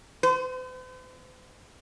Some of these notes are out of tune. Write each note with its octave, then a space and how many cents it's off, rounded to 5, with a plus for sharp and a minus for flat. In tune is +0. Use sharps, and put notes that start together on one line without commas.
C5 -45